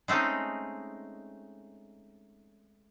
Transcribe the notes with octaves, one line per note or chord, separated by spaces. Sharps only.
G#3 A3 C4 C#4 D#4